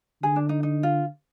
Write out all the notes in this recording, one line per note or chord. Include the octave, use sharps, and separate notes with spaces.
D3 G#4
D4
D#4
D#4
F4